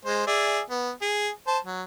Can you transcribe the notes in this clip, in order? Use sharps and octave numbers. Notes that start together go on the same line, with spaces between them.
G#3 C5
G#4 D5 E5
B3
G#4
C5 A5
F#3